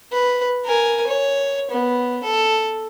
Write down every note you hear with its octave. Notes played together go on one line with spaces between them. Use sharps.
B4
A#4 G#5
C#5
B3
A4